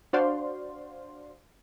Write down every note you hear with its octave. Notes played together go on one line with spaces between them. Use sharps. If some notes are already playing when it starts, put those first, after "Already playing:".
D4 F#4 C5 D5 F5 C6